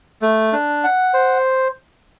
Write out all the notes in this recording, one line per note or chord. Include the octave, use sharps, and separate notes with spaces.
A3
D4
F#5
C5